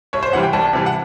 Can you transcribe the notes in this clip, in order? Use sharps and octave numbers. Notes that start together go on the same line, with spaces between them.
C2 C#5
C5
C3 E3 G3 F#5
G5
C2 A5
C3 E3 G3
F#5